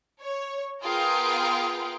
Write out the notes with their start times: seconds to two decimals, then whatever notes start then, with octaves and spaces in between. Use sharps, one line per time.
0.20 C#5
0.83 B3 F4 G#4 A#4 F5 G5